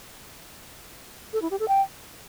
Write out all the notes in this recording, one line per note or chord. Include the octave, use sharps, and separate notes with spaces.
A4
E4
G4
A4
G5